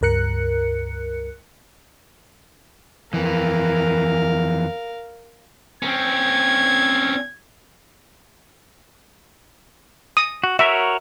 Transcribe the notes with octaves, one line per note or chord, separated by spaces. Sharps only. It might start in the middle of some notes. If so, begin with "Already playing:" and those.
C#2 G2 A#4 F#6 C#7
F2 E3 A#4 F5
C4 C#4 G#6
D#6
F#4
F#4 A#4 C#5 E5